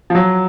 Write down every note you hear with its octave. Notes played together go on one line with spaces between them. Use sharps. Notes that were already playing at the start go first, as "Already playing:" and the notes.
F3
F#3